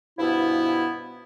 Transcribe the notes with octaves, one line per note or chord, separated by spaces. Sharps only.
G2 B2 F3 B3 E4